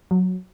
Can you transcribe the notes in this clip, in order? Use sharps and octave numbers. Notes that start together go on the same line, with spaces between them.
F#3